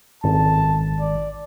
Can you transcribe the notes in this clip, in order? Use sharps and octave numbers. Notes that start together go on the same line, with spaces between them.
G#1 A5
D5